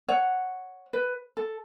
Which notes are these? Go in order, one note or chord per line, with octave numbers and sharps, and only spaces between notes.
C#5 F#5
B4
A4